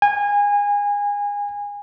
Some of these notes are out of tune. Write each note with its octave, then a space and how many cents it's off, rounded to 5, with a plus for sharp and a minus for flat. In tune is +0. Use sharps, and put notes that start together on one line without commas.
G#5 -25